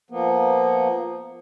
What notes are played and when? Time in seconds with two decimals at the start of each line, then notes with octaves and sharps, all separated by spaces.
0.11 F3 A#3 B3